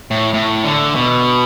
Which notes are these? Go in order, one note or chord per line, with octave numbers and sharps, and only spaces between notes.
A2
A2
D3
B2